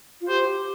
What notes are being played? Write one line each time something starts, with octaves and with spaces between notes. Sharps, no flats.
F4
G4 C5